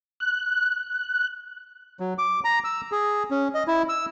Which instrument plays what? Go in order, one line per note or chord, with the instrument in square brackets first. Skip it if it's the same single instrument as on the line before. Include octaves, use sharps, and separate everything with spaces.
[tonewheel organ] F#6
[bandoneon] F#3
D6
A#5
E6
G#4
C#4
D#5
E4
E6